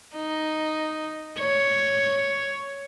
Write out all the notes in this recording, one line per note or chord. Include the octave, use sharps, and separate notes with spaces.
D#4
C#5